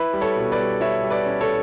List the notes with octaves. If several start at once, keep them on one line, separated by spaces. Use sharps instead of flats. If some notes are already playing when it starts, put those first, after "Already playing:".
Already playing: E4 B4
G3
A4 C#5
B2
B4 D5
G3
E4 C#5 E5
G3
B4 D5
C#4
A4 C#5